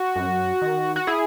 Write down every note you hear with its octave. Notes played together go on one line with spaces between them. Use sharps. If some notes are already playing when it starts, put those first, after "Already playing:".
Already playing: F#4
F#2
D#3
F#4
E4 G#4